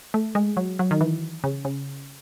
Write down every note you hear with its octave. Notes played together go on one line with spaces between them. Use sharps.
A3
G#3
F#3
F#3
D#3
E3
C#3
C#3